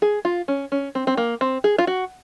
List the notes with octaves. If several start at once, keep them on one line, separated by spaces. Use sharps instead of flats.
G#4
F4
C#4
C#4
C4
C4
A#3
C4
G#4
F4
F#4